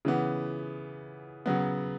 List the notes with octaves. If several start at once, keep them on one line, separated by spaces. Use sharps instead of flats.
C#3 E3 B3
C#3 F#3 B3